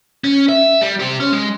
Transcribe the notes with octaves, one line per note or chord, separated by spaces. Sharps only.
C#4
E5
G3
G4 C5
C#4
G#3